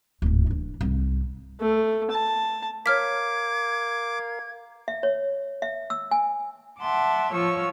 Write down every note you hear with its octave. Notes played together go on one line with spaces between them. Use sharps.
D1 G#2
E3 D4
C2 G#2
A3
A5
A#4 C#5 F5 D6 F6 G#6 B6
E5
C#5
E5
E6
G#5
E5 F#5 A5 C6 D6
F3 F4 C#5 C#6 E6